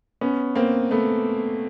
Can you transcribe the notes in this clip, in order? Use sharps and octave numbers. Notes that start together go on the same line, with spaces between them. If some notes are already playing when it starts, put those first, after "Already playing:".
B3 C#4
A#3 C4
A3 B3